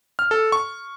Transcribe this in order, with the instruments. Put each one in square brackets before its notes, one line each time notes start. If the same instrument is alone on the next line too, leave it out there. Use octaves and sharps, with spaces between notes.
[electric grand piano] F6
A4
C#6